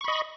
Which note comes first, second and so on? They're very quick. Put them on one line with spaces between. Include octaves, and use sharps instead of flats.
C#6 B5 D#5